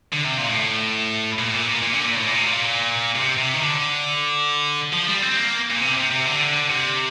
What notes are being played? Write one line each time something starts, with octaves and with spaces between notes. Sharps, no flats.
D3
C3
A#2
A2
A#2
A2
A#2
A#2
A#2
D3
A#2
A2
A#2
C3
A#2
C3
C3
D#3
D3
F3
G3
C4
A#3
A#2
C3
C3
C3
D3
C3